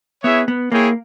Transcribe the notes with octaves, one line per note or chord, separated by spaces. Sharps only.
B3 E4 G#4 C#5 E5
B3
A#3 E4 G#4 C#5 G5